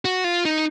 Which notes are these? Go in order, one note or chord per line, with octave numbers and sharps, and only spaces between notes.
F#4
F4
D#4